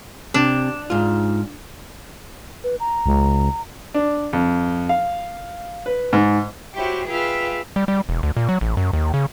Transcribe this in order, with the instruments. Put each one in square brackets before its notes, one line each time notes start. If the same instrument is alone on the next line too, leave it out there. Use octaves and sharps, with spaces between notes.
[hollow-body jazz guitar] C3 [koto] D4
[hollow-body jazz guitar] G#2 F4
[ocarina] B4
A#5
[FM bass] C#2
[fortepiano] D4
F2
F5
B4
G#2
[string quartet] E4 F#4 G4 C5 C#5 G5
F4 G#4 B4 E5 F5 G5
[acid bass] G3
G3
E1
D2
A#2
F#3
A1
F#2
D#2
C#3